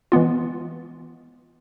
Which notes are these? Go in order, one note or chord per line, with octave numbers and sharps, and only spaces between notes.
E3 G#3 B3 F4